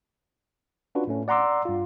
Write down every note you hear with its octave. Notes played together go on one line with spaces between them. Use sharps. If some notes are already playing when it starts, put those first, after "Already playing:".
C#4 D4 F4 F#4 B4
A2 A3 C#4
D5 F#5 A#5 C6 D6 E6
G2 F4